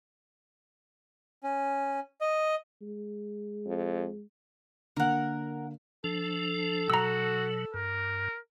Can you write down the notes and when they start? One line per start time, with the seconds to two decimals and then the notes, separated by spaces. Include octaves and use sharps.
1.44 C#4
2.21 D#5
2.82 G#3
3.67 F2
4.97 D3 A#3 A#4 F#5
6.04 F3 D4 A4
6.90 B2 F#3 F#4 A#5 E6
7.74 G2 A#4